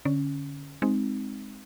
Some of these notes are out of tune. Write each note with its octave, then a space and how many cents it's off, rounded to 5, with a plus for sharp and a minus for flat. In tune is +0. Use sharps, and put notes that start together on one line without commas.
D3 -15 C#4 +0
G#3 +0 C4 +0 D#4 +0